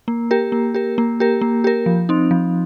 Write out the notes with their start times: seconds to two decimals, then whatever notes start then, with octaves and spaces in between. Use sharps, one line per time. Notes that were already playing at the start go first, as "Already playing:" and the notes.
0.08 A#3
0.31 G4 A#4
0.52 A#3
0.74 G4 A#4
0.98 A#3
1.20 G4 A#4
1.41 A#3
1.64 G4 A#4
1.86 F3
2.09 C4 D#4
2.31 F3